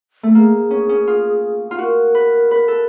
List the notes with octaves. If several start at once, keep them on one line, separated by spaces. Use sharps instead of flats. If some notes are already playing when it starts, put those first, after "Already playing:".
A3
A#3 G#4
C#4
C#4
F4
F4
F#4 A#4
B4
B4
A4